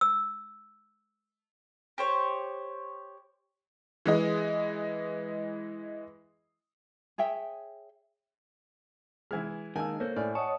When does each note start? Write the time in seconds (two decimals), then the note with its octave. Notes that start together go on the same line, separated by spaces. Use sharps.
0.01 E6
1.98 G4 C5 C#5
4.06 E3 G#3 D#5
7.18 G#4 C#5 E5 G5
9.31 E3 G#3 F6 G#6
9.76 D#3 G#3 A#3 G#5 A5 E6
10.00 A#3 A4 C5 C#5
10.16 A2 D5 G#5 F6
10.35 C#5 D#5 F#5 A5 C#6 D#6